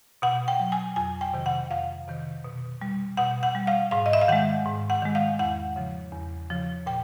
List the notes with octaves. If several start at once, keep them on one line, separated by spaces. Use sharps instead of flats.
B2 F#5
G5
F#3
G#5
F2 G#5
G5
C3 D#3
F#5
F2 F5
C3 D#3
B2
G3
B2 F#5
F#5
G3
F5
G#2 F5
D#5
E5
F5
D#3 G#3 F#5
G#2
F#5
D#3 G#3
F5
E2 F#5
C#3 F3
E2
C#3 F3
A#2 G5